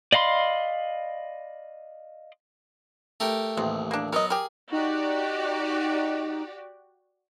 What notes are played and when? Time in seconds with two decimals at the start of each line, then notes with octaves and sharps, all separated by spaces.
0.12 D5 D#5 F5 B5 C6
3.20 A3 G4 A#4
3.58 A1 D#2 C3
3.91 A#3 D4
4.13 F#3 B3 A#4 D#5
4.30 G4 G#4 A#4
4.72 D#4 F#4 G4 D5